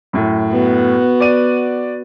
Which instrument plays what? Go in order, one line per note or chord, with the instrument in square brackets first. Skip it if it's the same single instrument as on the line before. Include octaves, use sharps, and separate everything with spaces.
[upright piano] F#2 A2
[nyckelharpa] B3 F#4
[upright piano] D5 D#7